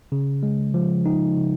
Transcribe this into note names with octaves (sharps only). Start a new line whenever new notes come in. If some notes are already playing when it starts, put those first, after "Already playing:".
C#3
G#3
F3
D#4
C#3